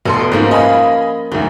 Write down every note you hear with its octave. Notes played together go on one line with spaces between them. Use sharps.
F1 B2 A4 C6
G#2 F3 A#3 C#4
D#5 F5 G#5 B5
D2 G#2 F#3